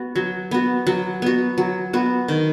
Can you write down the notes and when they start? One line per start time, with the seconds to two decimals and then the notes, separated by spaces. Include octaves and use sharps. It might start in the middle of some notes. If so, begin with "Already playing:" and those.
Already playing: B3 F#4
0.15 F#3
0.51 B3 F#4
0.87 F#3
1.22 B3 F#4
1.58 F#3
1.93 B3 F#4
2.28 D#3